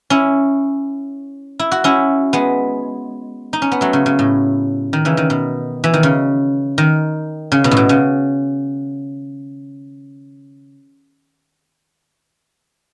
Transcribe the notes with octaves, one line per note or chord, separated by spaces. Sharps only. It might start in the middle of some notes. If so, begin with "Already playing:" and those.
C#4 E4
E4
F#4
C#4 E4
G#3 B3
D#4
C#4
B3
F#3 A3
C#3
C#3
A2
D#3
C#3 E3
D#3
B2
E3
D#3
C#3
D#3
C#3
B2
A2
B2
C#3